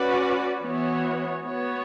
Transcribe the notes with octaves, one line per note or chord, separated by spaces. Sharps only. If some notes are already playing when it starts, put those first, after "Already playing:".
Already playing: C#4 F#4 B4 D5
E3 B3 F#4 C#5
B3 F#4 C#5